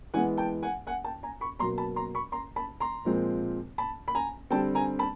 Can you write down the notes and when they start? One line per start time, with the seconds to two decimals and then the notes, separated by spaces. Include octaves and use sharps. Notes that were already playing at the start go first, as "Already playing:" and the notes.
0.14 E3 G#3 B3 F#5 G#5
0.38 G5 A5
0.63 F#5 G#5
0.87 F#5 G#5
1.04 G5 A5
1.23 G#5 A#5
1.41 B5 C#6
1.59 B2 F#3 A#3 A#5 C6
1.78 A5 B5
1.96 A#5 C6
2.15 B5 C#6
2.32 A#5 C6
2.56 A5 B5
2.80 A#5 C6
3.05 A#2 F3 G#3 C4
3.78 A5 B5
4.08 B5
4.15 G#5 A#5
4.51 D3 G3 C4 G5 A5
4.75 G#5 A#5
4.99 A5 B5